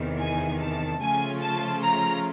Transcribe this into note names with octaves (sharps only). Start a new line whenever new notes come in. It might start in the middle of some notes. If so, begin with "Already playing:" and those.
Already playing: E2 C3 D#3
G#5
A5
C#3 F3 A3 C#4 F4 G#5
A5
A#5